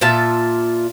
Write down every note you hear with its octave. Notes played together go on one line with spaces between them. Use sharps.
A#2 F4 E5 A5